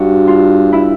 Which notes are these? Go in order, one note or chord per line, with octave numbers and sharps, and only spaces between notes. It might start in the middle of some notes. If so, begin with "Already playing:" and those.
Already playing: G2 F#4
F4
E4